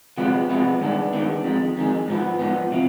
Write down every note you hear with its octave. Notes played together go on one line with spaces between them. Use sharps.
C3 F3 G#3 B3
C3 F3 G#3 B3
G2 D#3 G#3 B3 D4
G2 D#3 G#3 B3 D4
F2 D#3 G#3
F2 D#3 G#3
G#2 F3 B3
G#2 F3 B3
C3 F3